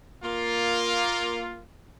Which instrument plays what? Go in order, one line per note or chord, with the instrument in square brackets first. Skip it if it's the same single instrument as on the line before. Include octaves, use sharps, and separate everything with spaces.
[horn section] A#3 F4